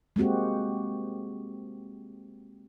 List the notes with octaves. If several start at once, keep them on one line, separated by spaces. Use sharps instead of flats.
G#3 A#3 C4 F#4 G4